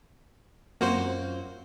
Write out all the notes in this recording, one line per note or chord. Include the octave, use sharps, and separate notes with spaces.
F#2 A#3 C4 F4 F#4 C5